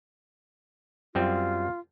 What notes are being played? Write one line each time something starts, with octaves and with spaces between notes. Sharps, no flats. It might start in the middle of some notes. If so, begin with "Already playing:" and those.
F#2 G3 C4 F4